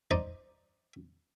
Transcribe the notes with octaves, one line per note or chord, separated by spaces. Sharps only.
D#4 C5 D5 D#5